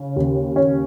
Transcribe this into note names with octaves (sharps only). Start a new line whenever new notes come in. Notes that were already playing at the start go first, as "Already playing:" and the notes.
Already playing: C#3 C#4
D#2
C#4